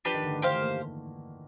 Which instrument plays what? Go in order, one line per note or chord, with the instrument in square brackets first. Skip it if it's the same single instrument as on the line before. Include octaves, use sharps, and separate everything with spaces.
[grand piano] F3 [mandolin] D4 G4 B4
[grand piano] D#3
D3
D#3
[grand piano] E3 [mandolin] G4 C5 F5
[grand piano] A3
A#3